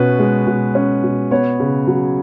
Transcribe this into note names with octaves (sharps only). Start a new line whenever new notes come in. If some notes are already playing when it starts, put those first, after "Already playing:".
Already playing: B2 C#4 B4
G#3
B2
C#4
B2
B3 C#5
C#3
F#3